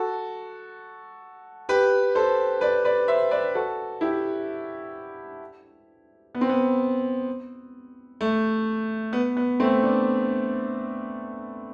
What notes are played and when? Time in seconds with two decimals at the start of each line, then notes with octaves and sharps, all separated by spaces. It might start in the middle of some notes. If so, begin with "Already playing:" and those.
Already playing: F#4 A4
1.69 G4 B4
2.15 A4 C5
2.61 B4 D5
2.85 B4 D5
3.08 C5 E5
3.31 B4 D5
3.55 F#4 A4
4.01 E4 G4
6.35 B3
6.41 C4
6.49 B3
8.21 A3
9.13 B3
9.37 B3
9.60 A3 C4
9.83 B3 D4